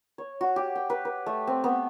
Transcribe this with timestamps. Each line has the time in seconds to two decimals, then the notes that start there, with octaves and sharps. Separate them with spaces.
0.18 C#5
0.41 F#4
0.56 G4
0.75 G5
0.90 B4
1.05 B4
1.26 A3
1.47 C4
1.64 B3